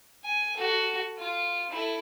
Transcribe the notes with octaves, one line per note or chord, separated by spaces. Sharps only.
G#5
F#4 A4
F4
E4 A4